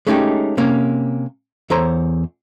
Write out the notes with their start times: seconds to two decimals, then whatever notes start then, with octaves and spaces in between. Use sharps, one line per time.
0.07 G#3 A3 C#4 D#4 F#4 G4
0.57 C3 A#3 C#4
1.70 E2 A4 C5 C#5 A#5 C6